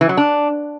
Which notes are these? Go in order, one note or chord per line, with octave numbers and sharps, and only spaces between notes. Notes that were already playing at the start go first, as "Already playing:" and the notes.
E3
F#3
D4